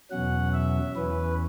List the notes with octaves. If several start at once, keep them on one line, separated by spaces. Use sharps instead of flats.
E2 B2 F#3 C#4 F#5
E5
E2 E3 C#4 B4